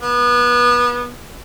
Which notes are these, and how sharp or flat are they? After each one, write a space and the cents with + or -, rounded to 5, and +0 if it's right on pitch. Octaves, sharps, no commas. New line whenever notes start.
B3 -25